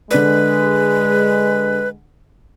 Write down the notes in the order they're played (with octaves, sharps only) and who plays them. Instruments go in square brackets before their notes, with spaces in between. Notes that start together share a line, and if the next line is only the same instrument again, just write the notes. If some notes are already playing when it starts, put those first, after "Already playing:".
[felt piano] D3 D5 [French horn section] G#3 [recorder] B4